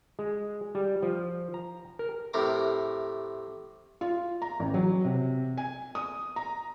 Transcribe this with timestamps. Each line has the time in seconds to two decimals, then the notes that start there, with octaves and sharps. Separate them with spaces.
0.19 G#3
0.75 G3
1.02 F3
1.54 A#5
1.99 A#4
2.33 A2 C3 A#4 D6
4.01 F4
4.42 A#5
4.60 A1
4.74 F#3
5.05 C3
5.57 G#5
5.95 D#6
6.36 A#5